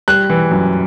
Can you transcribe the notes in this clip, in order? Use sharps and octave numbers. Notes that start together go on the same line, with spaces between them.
G3 F#6
E3
F#2